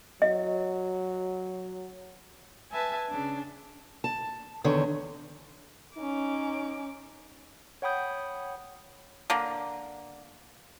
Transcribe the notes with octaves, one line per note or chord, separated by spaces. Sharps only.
F#3 D#5
B4 E5 G#5 A5
C#3 D4
A5
E2 D3 D#3 C#5
C#4 D#4 D6
C#5 F#5 G5 B5 D#6 G6
D3 A#3